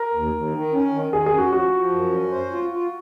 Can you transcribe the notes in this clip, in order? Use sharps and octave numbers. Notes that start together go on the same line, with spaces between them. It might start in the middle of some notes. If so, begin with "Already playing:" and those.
Already playing: A#4
D#2
D#2
D#3
C#4
D#3
D#3 G#4
G#4
C#4
F#4
F3 F#4
F3
F#2
C#4
C5
F4
F4